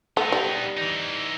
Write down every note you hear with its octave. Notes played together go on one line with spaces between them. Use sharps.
A3 B3 D#4
G3
E3 D#4